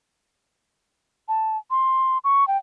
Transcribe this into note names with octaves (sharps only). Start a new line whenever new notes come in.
A5
C6
C#6
G5